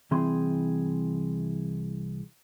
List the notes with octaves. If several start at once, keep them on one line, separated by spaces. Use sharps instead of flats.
C2 E3 C4 G#4 C6